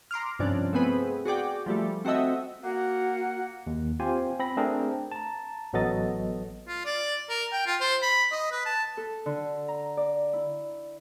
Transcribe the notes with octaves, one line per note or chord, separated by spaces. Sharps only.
A#5 C6 D6 F6
G2 C3 F3 C#4 D4
A3 B3 C4 G#4 B4
F#4 G#4 D5 G5
F3 G3 A3
C4 F#4 A4 D#5 E5
A#3 F#4 F#5
D#2
C4 F4 G4 C5 G#5
C4 B5 A#6
A3 C4 D4 G#4 A#4
A5 A#5
A1 F#3 B3 A4 D#5 A6
F4
D5
A#4
G5
F4
C5
B5
D#5
B4
A5
A4
D3
A#5
D5
E4